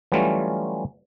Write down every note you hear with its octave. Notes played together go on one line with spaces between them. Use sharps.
E3 F#3 G3 A3 C#4 F4